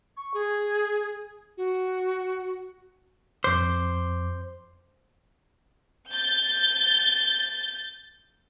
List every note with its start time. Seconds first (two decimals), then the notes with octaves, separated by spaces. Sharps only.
0.17 C#6
0.34 G#4
1.57 F#4
3.44 F2 C5 D6
6.11 G6 A6